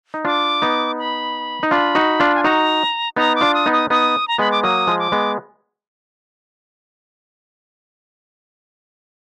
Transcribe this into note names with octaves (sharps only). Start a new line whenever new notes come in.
D#4
D4 F4 D6
B3 D#4
B5
D#4
D4 F4 B5
D#4 F#4
D4 F4
G#5
D#4 F#4 A#5
B3 D#4 A#5
D6
D4 F4
D#6
B3 D#4
D#6
B3 D#4 D#6
A#5
G#3 B3 B5
D6
F#3 A#3 D#6
F3 G#3
D6
G#3 B3